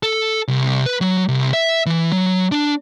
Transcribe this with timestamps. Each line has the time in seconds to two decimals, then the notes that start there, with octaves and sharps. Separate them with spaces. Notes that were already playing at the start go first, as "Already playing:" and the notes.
0.03 A4
0.48 C2
0.86 B4
1.01 F#3
1.29 C2
1.53 E5
1.86 E3
2.12 F#3
2.52 D4